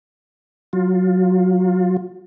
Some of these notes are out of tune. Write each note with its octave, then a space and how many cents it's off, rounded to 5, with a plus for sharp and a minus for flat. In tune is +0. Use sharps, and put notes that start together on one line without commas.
F#3 -5 F4 +20